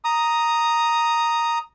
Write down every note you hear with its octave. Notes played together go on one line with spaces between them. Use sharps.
A#5 D#6